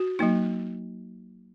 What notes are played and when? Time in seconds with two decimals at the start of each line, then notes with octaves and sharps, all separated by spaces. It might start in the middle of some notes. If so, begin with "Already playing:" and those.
Already playing: F#4
0.19 F#3 A#3 D#4